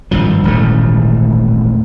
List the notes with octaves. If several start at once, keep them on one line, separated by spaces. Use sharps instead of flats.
G#1 G2 F3
D#1 A1 G#2 A3